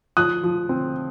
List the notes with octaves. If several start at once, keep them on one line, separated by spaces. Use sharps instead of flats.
F3 D#6 F#6
F3
C4